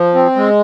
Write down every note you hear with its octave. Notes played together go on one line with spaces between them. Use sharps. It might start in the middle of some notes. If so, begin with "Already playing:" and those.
Already playing: F3
C4
G#3